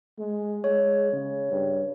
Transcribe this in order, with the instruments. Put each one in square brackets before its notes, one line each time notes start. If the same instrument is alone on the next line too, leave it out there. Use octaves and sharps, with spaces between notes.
[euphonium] G#3
[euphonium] G#3 [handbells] C#5
[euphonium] C#3
G2